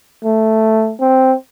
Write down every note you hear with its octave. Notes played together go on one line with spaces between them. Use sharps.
A3
C4